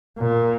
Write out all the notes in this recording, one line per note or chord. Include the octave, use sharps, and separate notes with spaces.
A#2